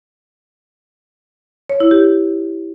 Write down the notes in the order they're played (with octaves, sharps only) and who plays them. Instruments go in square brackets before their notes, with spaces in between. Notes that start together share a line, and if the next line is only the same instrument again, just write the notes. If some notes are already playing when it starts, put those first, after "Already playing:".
[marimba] C#5
E4
G4